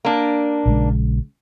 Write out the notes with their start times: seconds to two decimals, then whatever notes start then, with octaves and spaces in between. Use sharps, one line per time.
0.05 A#3 D4
0.66 A#1 C#3 G#3